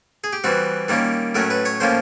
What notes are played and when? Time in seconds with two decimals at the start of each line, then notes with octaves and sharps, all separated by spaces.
0.24 G#4
0.33 G4
0.44 E3 G3 C4 F#4
0.89 D#3 G3 A#3 C#4
1.35 A2 F#3 A3 C#4 A#4
1.50 B4
1.65 C#5
1.80 A2 F3 A#3 C#4 C5